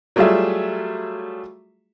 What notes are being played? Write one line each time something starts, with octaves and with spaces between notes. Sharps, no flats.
F#3 G3 A3 F4 G#4 E5